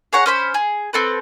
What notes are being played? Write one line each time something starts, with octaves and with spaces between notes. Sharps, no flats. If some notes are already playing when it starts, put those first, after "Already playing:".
G#4 C#5 F#5 A#5
C#4 C5 B5
G#4
C4 A4 B4